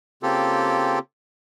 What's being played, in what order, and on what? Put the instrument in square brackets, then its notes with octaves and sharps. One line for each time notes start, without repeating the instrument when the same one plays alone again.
[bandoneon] C#3 A#3 C4 F4 G4 A4